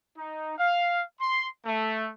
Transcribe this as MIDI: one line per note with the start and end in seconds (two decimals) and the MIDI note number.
0.17 0.55 63
0.58 1.03 77
1.20 1.48 84
1.65 2.09 57